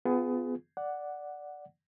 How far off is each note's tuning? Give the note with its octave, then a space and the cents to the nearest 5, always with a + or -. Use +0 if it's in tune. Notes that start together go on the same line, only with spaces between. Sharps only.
B3 +30 F4 +0 G#4 +0
D5 +0 F#5 +0